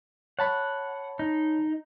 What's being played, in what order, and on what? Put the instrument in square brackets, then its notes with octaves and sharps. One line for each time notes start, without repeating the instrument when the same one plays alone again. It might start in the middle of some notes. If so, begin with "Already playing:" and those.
[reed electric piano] C#5 A5 B5 [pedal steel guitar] F#5
[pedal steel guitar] D#4